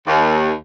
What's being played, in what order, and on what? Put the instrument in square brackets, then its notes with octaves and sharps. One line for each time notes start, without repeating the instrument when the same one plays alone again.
[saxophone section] D#2